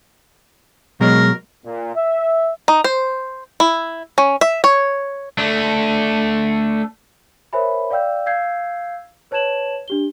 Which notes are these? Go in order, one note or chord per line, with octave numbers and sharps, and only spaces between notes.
B2 F#3 G#3 A#4
A#2
E5
D#4
C5
E4
C#4
E5
C#5
A3 D4
A#4 C5 C#5 E5 G#5 B5
D5 F5 G5 E6 G6
F5 E6 G6 G#6 C7
B4 C#5 A5 G#6 E7 F#7
D4 G4 G7